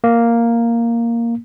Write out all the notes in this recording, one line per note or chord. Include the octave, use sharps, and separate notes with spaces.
A#3